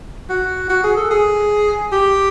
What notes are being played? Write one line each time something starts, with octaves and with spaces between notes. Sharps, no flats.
F#4
F#4
G#4
A4
G#4
G4